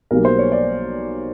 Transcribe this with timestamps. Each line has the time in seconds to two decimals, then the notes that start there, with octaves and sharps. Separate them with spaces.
0.11 B1 B2 G3 A#3 A#4
0.25 C5
0.38 C#5
0.52 D5